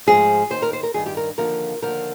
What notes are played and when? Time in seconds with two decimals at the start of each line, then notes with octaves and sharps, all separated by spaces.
0.07 G#2 F3 G#4
0.50 D#2 D#3 C5
0.62 A#4
0.73 C5
0.83 A#4
0.94 G2 D#3 G#4
1.06 G4
1.17 A#4
1.38 D#2 D3 F3 A#4
1.82 D#2 D3 F3 A#4